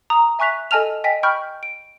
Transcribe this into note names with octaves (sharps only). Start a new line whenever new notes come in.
A#5 D#6
E5 G#5 C#6 F#6 B6 F7
A4 D#5 G#5 A5 F6 F7
D#5 G5 G#5 B6
G5 B5 C#6 F6 G6
D7